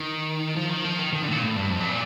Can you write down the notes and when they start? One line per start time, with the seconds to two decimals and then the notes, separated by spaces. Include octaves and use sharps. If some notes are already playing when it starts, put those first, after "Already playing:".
Already playing: D#3
0.56 F3
0.69 D#3
0.84 F3
0.99 D#3
1.13 D#3
1.22 D3
1.28 A2
1.32 A#2
1.42 A2
1.56 G2
1.70 F2
1.80 G2
1.89 A#2